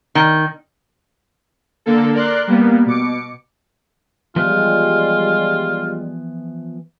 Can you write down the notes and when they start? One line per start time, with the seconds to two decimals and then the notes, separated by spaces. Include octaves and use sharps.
0.15 D#3
1.86 D3 A#3 A4
2.14 A#4 D5 C6 F#6
2.47 G3 A#3 B3
2.86 B2 D6 C#7
4.36 E3 F3 G3 G#3 B3 F4